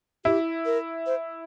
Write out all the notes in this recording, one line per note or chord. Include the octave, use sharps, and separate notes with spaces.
E4 G4
A#4
C5